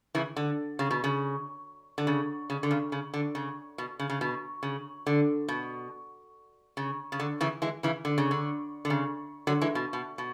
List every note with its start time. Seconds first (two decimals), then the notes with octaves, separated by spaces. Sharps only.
0.15 C#3 E3
0.37 D3
0.79 C#3
0.91 B2
1.04 C#3
1.98 D3
2.07 C#3
2.50 C#3
2.63 D3
2.71 C#3
2.92 C#3
3.14 D3
3.35 C#3
3.78 B2
3.99 C#3
4.10 C#3
4.21 B2
4.63 C#3
5.07 D3
5.48 B2
6.77 C#3
7.12 C#3
7.20 D3
7.41 C#3 E3
7.62 E3 G#3
7.83 C#3 E3
8.05 D3
8.18 C#3
8.31 D3
8.85 D3
8.90 C#3
9.47 D3 F#3
9.61 E3 G#3
9.75 B2
9.93 B2
10.18 B2